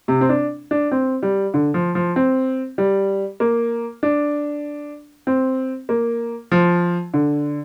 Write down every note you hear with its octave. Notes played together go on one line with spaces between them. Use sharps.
C3
C4
D4
D4
C4
G3
D3
F3
F3
C4
G3
A#3
D4
C4
A#3
F3
D3